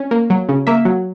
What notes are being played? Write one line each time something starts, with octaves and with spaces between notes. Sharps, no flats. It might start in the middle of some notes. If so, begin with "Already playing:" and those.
Already playing: C#4
A#3
F#3
C#3
A#3 E5
F#3